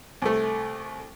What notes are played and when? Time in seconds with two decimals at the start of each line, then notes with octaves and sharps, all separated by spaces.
0.22 C2 A3